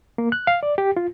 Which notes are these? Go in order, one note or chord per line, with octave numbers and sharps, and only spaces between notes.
A#3
F#6
F5
D5
G4
F4